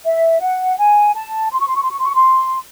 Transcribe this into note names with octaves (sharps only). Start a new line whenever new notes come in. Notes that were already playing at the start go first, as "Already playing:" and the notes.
E5
F#5
G#5
A5
C6
C#6
C6
C#6
C6
C#6
C6
C#6
C6